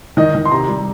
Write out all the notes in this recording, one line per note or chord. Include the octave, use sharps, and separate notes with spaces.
D#3 D#5
D#3
C6
C3 A#5
G3